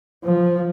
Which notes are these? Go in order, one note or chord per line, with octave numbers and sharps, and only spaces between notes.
F3